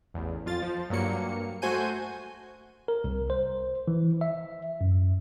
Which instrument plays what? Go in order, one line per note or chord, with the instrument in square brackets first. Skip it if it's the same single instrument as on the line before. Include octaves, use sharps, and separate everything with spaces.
[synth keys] A1 E2
F2 F4 A6
F3
G2 F#3 A#3 C#7
A3 F#4 C5 G#5 G6 D#7
[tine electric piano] A#4
C2
C5
E3
E5
F#2